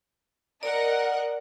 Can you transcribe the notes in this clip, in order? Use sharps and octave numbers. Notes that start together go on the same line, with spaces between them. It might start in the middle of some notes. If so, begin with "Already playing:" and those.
A#4 D5 D#5 F#5